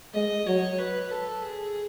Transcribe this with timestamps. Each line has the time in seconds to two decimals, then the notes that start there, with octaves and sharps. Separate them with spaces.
0.14 G#3 D#5
0.47 F#3 C#5
0.79 B4
1.11 A4
1.42 G#4